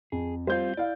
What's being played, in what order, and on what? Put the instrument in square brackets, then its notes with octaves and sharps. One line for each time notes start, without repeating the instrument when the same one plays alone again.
[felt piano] F2 [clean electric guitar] G#4
[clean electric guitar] G3 C4 F4 [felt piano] C5 G6
[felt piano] E4 F5 [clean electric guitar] D5